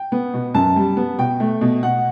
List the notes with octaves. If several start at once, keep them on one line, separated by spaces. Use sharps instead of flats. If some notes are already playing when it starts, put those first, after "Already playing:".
Already playing: G5
B3
B2
F#2 A5
G3
B3
B2 G5
A3
B2
B2 F#5